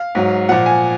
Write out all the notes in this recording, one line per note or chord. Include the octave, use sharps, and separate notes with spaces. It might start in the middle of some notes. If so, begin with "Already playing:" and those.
Already playing: F5
G#2 F#3
A#2 F3 F#5
G#5